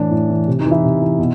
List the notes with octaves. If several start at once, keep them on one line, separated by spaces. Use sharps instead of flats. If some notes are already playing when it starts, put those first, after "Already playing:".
Already playing: A2 E3 D4
A2
E3
C3
D#4
E3
E4
C3
E3
B2